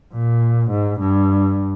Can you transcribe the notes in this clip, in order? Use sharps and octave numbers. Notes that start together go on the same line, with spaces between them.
A#2
G#2
G2